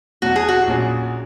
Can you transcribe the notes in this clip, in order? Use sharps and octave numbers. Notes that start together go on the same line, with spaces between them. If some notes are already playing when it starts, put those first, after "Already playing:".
E2 B2 F#3 F#4
G#4
F#4
A#1 A#2 F#3 C#4 G#4